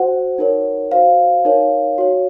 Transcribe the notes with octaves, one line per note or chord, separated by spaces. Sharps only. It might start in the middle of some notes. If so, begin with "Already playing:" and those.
Already playing: F#4 C5 F#5
D#4 A#4 C#5
F#4 C5 F5
D#4 A#4 C#5
F#4 C#5